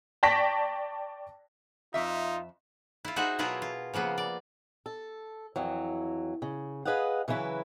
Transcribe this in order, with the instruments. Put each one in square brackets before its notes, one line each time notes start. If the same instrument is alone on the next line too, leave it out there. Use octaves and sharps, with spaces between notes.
[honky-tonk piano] D5 G5 A5 C#6 A#6 B6
[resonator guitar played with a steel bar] F2 E5 [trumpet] D#4 [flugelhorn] F4
[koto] E4 F4
D#4 F#4 G#4 C5 E5 F#5
B2 F#3 E4 F4 G#4 A#4
F4
C#3 F3 A#3 B3
D5
[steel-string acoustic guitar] A4
F2 E3 F#3
C#3
G#4 B4 D#5 F5 F#5
C#3 E3 F#3 E4 B4